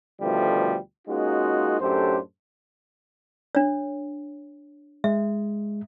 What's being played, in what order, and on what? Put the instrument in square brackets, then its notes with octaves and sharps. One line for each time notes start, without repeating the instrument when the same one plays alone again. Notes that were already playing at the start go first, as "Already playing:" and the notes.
[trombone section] D2 B2 D#3 F3 G3 A3
G#3 A#3 C#4 D#4 F4 F#4
F#2 A2 D4 G4 A4 C5
[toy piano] D4 C#5
[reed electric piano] G#3 [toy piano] E5